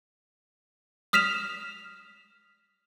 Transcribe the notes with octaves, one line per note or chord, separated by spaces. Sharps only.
D#6 F6 B6 E7 F7